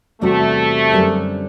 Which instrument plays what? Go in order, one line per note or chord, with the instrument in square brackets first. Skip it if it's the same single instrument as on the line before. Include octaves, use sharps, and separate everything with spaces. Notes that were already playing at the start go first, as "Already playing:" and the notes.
[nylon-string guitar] E2 C3 G3 C4 F#4 [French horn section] A3
[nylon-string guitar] F#2 D3 G3 C4